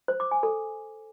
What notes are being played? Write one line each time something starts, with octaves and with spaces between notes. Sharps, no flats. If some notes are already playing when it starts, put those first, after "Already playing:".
C5
D6
G#5
A4